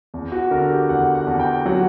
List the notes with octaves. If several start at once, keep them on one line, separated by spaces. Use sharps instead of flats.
E2
F#4
D3 A#4
G4
E2 F#5
F#5
E2
G5
F#3 F#5